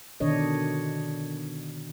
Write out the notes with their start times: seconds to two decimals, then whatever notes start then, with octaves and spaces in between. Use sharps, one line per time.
0.20 B2 D3 D#3 D4 C#5 D#5